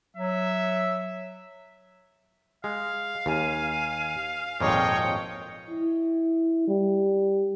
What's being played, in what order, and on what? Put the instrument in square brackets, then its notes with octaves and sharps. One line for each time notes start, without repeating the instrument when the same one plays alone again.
[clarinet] F#3 [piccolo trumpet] E5
[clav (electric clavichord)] G#3 [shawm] F5
[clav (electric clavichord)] D#2 [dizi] G#5
[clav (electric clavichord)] G#1 F2 A#2 [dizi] C#5 [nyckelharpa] D#5 G5
[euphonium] E4
G3